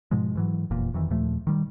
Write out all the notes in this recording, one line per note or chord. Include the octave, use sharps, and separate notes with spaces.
G#2 B2 F3 G#3
G#2 E3 F#3
F1 E2 A#2
F2 D#3 E3
D#2 A#2 F3 A3
D#3 G3